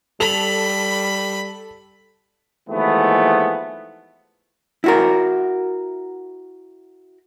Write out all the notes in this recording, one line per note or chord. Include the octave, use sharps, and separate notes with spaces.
G3 A4 B5 F7
D#2 E3 F3 G#3 A3 B3
E4 F#4 A#4